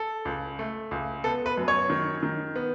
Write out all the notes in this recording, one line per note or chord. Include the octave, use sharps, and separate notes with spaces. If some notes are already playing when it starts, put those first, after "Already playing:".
Already playing: A4
C#2
A3
C#2
B3 A4
B4
F#2
C#5
D#3
D#3
B3